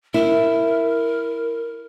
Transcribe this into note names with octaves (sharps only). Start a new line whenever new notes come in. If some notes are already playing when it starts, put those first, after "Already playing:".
E4 A#4